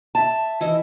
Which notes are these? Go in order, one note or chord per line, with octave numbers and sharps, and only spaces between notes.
E5 A5
E3 E4 D#5